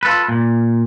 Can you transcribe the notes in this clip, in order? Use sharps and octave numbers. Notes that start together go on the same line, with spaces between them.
F4 A4 B4
A#2